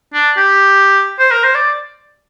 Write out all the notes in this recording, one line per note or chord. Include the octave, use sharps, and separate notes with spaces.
D4
G4
C5
A#4
C5
D5